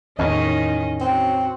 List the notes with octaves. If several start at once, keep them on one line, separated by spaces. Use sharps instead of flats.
E2 A2 D#3 C#4 D#4 D#5
C4 F#4